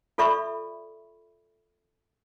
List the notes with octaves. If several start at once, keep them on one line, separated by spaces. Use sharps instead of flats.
F4 A4 D5 E5 B5 C#6